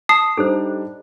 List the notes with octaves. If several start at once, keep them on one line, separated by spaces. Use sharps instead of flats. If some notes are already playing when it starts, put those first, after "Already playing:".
A5 D#6 C7
G3 D4 D#4 A4 C5